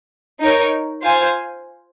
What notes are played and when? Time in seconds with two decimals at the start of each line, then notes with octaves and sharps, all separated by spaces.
0.40 D#4 A#4 C#5
1.02 F4 C5 F5 G#5